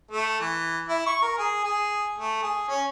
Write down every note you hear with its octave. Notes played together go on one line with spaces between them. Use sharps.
A3
E3
E4
C#6
A#4
G#4
G#4
A3
G#4
C#4